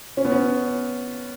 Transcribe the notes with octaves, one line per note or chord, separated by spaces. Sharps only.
C#4
B3
C#4